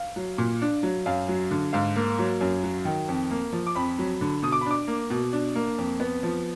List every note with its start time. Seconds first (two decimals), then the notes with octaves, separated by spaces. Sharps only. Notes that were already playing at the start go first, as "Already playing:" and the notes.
Already playing: F5
0.16 F#3
0.38 A#2
0.62 D4
0.83 F#3
1.06 F#2 F5
1.28 F#3
1.51 D3
1.73 G#2 F5
1.96 A#3
2.19 F#3
2.41 F#2
2.63 F#3
2.85 D#3
3.08 F2
3.31 A#3
3.52 F3
3.67 D6
3.75 F2 B5
3.98 F#3
4.21 D3
4.42 B2 D#6
4.52 D6
4.61 B5
4.66 D4 D6
4.87 A#3
5.10 B2
5.33 D4
5.55 A#3
5.78 F2
6.00 B3
6.23 F3